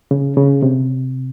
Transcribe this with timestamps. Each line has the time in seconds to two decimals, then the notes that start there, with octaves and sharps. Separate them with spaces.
0.11 C#3
0.37 C#3
0.62 C3